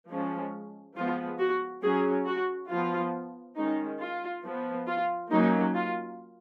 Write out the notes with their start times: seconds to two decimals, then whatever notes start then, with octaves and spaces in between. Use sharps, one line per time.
0.09 F3 G#3 C#4
0.96 F3 G#3 B3 F4
1.39 F#4
1.83 F#3 C#4 G#4
2.26 F#4
2.70 F3 B3 F4
3.57 D#3 G#3 C#4 D#4
4.01 F4
4.45 F3 B3
4.88 F4
5.31 F#3 A#3 C#4 D#4
5.75 F4